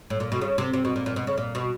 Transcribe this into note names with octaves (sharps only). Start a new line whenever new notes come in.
A2
A#2
B2
C#3
C3
C3
B2
A#2
A#2
B2
C#3
A#2
B2